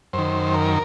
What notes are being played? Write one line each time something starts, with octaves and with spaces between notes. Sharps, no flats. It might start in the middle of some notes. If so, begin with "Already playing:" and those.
F#2 D#3 C5
A#4